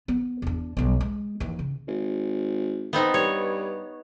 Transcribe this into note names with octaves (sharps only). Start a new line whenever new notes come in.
B3
E2 D4
B1 G3
G#3
D#2 E3
C#3
G#1
B3 C4 D#4
G2 C#5